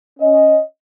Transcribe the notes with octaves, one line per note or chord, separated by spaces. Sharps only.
C#4 D#5